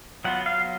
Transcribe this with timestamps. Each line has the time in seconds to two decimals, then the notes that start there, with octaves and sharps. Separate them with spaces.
0.24 F#3 B3 F4 F#5
0.46 F5